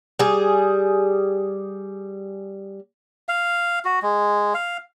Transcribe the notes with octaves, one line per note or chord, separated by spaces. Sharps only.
G3 G#4
F5
F#4
G#3
F5